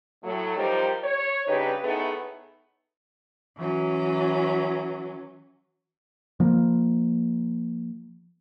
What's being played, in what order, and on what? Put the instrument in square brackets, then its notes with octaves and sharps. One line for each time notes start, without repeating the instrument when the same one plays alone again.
[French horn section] A2 F#3 A3
F3 G3 D#4 G4 A#4 C5
C#5
G2 C#3 D#4 G4 B4
A2 A3 B3 D#4 G#4
[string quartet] E3 F#3 C#4
[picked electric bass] F3 A#3